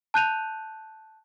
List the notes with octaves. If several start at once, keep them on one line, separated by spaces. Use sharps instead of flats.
A5 F#6 G6 D#7 F7